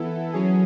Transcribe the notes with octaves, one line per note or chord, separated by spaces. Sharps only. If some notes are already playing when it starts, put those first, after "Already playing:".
Already playing: E3 B3 E4 A4
F#3 C#4 G#4